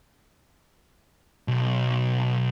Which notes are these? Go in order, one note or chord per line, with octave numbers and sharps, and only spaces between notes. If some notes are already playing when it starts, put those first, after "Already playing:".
B1